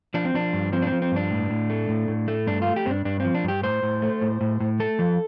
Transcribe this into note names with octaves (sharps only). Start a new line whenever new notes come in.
F3 D4
C4
F3 D4
G2
F3 C4
D4
F3 C4
C4
G2 D4
A2
A2
A3
A2
A2
A3
G2 D4
A3 F4
G4
G2 C4 D4
G2 D4
F3 C4
D4
G2 G4
A2 C5
A2
A3
A2
A2
A2
A3 A4
F3